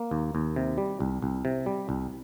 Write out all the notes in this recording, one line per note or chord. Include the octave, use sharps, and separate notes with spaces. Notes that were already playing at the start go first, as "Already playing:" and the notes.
Already playing: A#3
D#2
D#2
C3
G3
C2
C2
C3
G3
C2